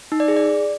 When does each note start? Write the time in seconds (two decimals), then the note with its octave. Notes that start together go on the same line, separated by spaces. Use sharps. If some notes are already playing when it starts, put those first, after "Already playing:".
0.12 D#4
0.20 D5
0.28 G#4
0.37 D5